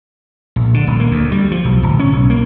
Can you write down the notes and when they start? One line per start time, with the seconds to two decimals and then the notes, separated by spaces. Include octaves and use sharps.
0.56 A#1
0.74 D3
0.87 D#1
1.00 A#3
1.11 D2
1.32 G3
1.51 F3
1.65 B1
1.83 D1
1.99 C#4
2.12 B1
2.30 A#3